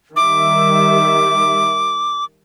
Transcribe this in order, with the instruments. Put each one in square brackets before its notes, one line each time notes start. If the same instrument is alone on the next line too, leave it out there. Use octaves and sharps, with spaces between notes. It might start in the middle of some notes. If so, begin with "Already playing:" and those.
[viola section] D#3 G3 E5 [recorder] D6